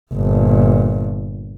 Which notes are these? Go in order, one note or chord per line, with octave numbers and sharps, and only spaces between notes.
G1 A#2